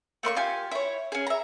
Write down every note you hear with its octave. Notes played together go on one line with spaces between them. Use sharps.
A3 A#3 C6 C#6
F4 G4 G#5
E4 C#5
C#4 G#4
E5 A#5